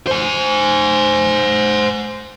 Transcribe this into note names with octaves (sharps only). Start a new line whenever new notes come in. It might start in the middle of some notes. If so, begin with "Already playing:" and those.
C5 G#5